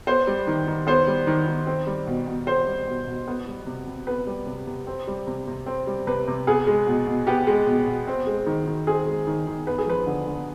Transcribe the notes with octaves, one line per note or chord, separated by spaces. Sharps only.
B3 C5
G3
D#3
D#3
B3 C5
G3
D#3
D#3
C4
G3
B2
B2
C4 C5
G3
B2
B2
B3
G3
C3
C3
B3 B4
G3
C3
C3
C4
G3
C3
C3
C4
G3
C3 B4
C3
B3 G#4
G#3
B2
B2
B3 G4
G#3
B2
B2
C4
G#3
D#3
D#3
C4 G#4
G#3
D#3
D#3
B3 B4
G#4
F3 B4
D3
D3